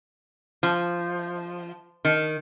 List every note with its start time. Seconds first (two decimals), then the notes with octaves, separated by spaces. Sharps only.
0.63 F3
2.05 D#3